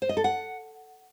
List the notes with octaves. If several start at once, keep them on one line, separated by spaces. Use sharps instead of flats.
C5
D#5
A4
F#5